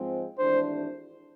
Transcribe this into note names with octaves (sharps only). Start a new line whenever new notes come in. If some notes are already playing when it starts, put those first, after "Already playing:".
Already playing: G#2 F3 G#3 C4
G#1 G#2 E3 A3 D4 C5